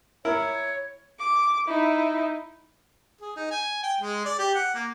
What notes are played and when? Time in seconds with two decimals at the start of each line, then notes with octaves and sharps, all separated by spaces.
0.25 E4 A#4 C#5
1.19 D6
1.68 D#4 E4
3.21 G#4
3.36 D#4
3.51 G#5
3.83 G5
4.01 G#3
4.25 D5
4.39 G4
4.55 F#5
4.75 A#3